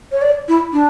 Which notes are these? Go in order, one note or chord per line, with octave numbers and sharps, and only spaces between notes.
C#5
D5
E4
D4